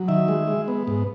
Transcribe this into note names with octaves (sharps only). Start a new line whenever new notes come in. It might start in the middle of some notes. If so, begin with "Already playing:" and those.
Already playing: F#3
D#3 E5
G#3
G#3
B3
G#2